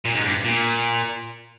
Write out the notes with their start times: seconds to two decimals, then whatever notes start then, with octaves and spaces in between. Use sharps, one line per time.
0.05 A#2
0.15 G#2
0.25 G2
0.45 A#2